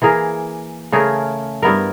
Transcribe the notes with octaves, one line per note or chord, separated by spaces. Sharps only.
E3 A#3 G#4 A#4
C#3 A3 G#4 A#4
G2 B3 E4 A#4